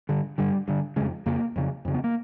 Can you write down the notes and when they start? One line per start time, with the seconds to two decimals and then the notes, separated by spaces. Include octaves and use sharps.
0.09 G2 D3
0.38 G2 D3 G3
0.68 G2 D3
0.96 F2 C#3 G#3
1.26 F2 C#3 A#3
1.56 F2 C#3
1.85 F2 C#3
1.94 B3
2.04 A#3